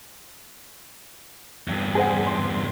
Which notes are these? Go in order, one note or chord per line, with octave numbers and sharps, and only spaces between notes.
E2 G2
G#4 C5 F#5
C6